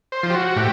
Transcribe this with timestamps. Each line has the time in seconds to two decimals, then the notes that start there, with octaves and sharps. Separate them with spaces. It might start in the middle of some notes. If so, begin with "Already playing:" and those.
0.12 C5
0.23 F3
0.30 G4
0.34 F#4
0.56 A2 G4